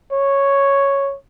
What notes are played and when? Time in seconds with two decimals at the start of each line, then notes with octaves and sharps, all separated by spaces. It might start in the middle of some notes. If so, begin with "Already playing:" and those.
0.13 C#5